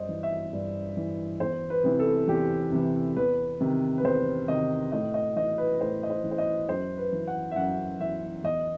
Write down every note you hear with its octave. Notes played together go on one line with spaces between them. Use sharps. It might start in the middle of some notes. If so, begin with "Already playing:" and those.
Already playing: G2 C5 D#5
E3
E5
G2
E3
E2 C5
B4
C3 E3
A4
E2 G4
C3 E3
E2 B4
C3 D#3
B4
E2 C5
C3 D#3 D#5
A2 D#5
D#5
E3 D#5
B4
A2 C5
D#5
C5
E3
C5
D#5
F#2 C5
B4
E3
F#5
E5
F#2 F#5
E3 E5
E2 D#5